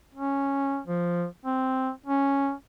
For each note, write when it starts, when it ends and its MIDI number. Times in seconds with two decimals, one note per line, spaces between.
0.15 0.80 61
0.87 1.25 53
1.45 1.90 60
2.06 2.52 61